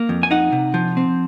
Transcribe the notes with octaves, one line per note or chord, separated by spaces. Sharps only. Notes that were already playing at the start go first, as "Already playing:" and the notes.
Already playing: A#3
F2
G#5
D#4 D#5 F#5
C3
F3
C4